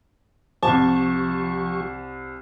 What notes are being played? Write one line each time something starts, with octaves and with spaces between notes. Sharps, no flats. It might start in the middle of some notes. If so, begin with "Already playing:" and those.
C2 F3 G4 A5 C#6